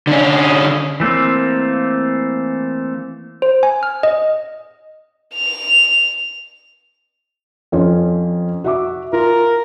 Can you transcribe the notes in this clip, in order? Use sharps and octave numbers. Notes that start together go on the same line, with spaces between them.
D3 C#4
E3 A3 A#3 C4
C5
G#5
F6
D#5
F7
F2 C#4 F4
F#4 E5 D6
F4 A#4